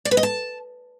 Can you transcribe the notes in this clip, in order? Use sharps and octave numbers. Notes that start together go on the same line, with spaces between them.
D5
B4
D#5
A5